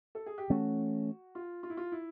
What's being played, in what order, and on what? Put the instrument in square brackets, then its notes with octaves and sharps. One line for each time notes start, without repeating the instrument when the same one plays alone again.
[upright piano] A4
G#4
G4
[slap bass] E3 A3 C#4 [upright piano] F#4
[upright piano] F4
F4
E4
F4
E4